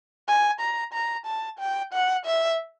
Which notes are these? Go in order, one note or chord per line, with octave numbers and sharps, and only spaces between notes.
G#5
A#5
A#5
A5
G5
F#5
E5